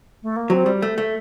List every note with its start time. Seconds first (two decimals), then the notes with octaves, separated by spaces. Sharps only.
0.22 A3
0.36 A#3
0.50 F#3 C4
0.66 G3
0.82 A3
0.98 A3